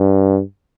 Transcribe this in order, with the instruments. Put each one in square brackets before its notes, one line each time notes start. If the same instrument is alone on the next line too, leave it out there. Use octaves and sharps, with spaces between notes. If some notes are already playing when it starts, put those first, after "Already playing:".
Already playing: [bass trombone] G2